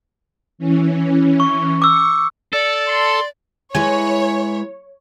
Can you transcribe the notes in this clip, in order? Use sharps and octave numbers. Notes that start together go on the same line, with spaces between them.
E3 C#4
C#6
C#6 D6 E6 C#7
A4 D5
C6
G#3 E4 B4 C#5 G#5